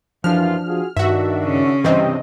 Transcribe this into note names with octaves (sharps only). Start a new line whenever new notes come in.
F#2 E3 F3 D4 F4 F6
F4 F#4 G#4
G2 D#3 D4 F#4 E5
C#3 C#4
G2 C3 E3 C4 D#5